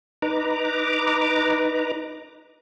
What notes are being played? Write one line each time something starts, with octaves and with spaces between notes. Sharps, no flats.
D#4 B4 A#5 D6